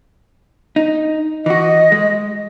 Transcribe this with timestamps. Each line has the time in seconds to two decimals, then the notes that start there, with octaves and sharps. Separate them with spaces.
0.76 D#4
1.46 E3 F#4 D#5
1.92 G#3